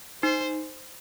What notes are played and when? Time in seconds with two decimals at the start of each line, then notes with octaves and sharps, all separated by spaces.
0.23 D#4 C5